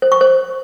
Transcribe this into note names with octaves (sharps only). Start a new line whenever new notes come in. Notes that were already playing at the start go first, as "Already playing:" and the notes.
C5
C#6
C5